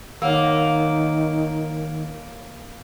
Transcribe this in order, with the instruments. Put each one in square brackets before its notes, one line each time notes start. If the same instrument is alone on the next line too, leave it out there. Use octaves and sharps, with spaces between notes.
[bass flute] D#3 [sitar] A#3 [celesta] C#5 F#5 E6